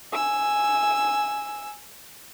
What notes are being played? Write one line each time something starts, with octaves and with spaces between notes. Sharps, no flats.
G#5 E6